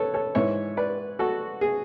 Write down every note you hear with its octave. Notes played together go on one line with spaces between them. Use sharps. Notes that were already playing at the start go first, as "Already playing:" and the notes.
Already playing: A4 B4 C#5
A4 C#5
G#2 E3 C#5 E5
B4 D5
F#4 A4
G#4